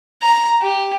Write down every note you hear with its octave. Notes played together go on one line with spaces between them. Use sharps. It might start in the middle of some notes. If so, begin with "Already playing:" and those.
A#5
G4